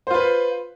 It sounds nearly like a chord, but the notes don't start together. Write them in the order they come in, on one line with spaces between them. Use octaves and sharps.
C5 F4 B4